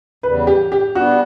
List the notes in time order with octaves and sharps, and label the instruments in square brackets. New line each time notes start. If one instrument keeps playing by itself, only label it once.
[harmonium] E2 C#3 G3 [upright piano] B4
[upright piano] G4
G4
[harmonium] G3 B3 D4 [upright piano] F#4